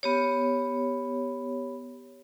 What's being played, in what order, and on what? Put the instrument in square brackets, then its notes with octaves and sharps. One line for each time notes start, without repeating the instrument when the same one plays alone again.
[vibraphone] B3 G4 C#5